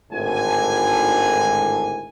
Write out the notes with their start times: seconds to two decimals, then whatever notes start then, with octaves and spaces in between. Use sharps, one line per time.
0.12 G#1 A2 D3 G#5